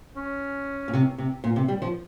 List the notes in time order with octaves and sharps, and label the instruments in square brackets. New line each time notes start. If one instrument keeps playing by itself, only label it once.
[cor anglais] C#4
[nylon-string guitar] A#2
C3
C3
A#2
C3
G3
F3